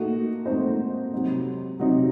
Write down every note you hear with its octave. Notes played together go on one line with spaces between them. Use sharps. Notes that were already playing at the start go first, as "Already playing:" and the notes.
Already playing: A#2 A3 D#4 F#4
A#2 A3 C4 D#4 C5
C3 F#3 C4 D#4
C3 F#3 C4 D#4